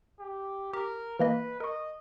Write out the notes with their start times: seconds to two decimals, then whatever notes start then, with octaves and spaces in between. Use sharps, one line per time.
0.20 G4
0.73 G4 A#4
1.19 E3 A#3 B4 D#5
1.60 A#4 D#5 C#6